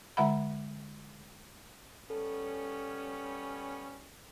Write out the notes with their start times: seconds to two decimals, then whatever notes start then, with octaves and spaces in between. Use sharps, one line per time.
0.17 D3 G#3 E5 F#5 B5
2.10 G3 B3 C#4 A4